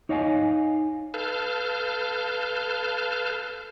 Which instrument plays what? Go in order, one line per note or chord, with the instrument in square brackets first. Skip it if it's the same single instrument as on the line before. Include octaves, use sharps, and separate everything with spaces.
[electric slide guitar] D#4 C#5 D#5 F5 G5 G#5
[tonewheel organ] A4 B4 F5 A5 F6 G6